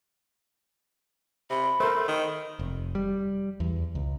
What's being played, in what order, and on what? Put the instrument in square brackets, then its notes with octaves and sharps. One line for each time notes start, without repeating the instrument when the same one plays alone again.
[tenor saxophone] C3 [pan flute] B5
[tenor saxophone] A3 [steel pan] A#4 C5
[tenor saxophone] D#3
[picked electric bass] F1
G3
E2
C#2